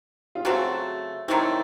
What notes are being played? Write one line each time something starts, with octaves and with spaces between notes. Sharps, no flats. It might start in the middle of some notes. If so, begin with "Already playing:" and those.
F4
C#3 F#3 A3 C4 F#4
D#3 F#3 A3 C4 E4